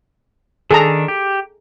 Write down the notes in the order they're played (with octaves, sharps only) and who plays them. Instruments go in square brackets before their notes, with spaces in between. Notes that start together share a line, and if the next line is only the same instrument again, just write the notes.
[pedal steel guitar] D#3 D4 [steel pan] G#4 A4 A#5
[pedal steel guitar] G4